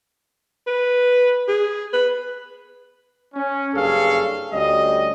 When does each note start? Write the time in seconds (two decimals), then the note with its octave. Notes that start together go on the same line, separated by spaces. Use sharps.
0.67 B4
1.48 G#4
1.93 B4
3.35 C#4
3.74 F#1 G2 G#4 A4 C#5 F5
4.52 D2 G3 C#4 D#5